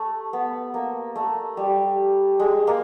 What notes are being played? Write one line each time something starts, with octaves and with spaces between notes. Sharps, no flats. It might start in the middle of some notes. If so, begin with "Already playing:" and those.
Already playing: A3
B3
A#3
A3
G3
G#3
A#3